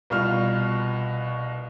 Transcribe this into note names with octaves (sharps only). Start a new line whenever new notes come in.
C2 B2 F4 C#6 F6